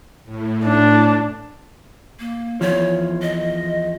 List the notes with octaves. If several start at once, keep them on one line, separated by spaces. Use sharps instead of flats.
A2
D4
A#3
E2 F3 C#5
D#5